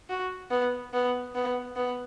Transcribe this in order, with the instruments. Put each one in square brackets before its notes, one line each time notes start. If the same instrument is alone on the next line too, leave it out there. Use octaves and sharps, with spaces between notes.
[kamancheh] F#4
B3
B3
B3
B3